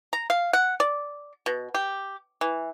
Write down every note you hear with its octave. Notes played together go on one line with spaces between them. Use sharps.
A#5
F5
F#5
D5
B2
G4
E3